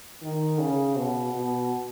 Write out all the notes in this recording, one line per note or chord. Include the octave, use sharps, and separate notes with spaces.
D#3
C#3
B2
B2